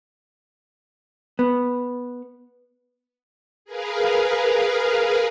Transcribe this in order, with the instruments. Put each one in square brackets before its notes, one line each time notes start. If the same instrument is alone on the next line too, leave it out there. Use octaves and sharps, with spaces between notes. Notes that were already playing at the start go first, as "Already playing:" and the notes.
[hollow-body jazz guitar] B3
[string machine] G#4 A#4 B4 F5